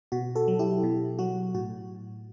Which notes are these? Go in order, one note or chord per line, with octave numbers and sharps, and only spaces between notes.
B2 F#4
F#4 A4
F#3
E4 G4
B2
F#3 F#4
A2 F#4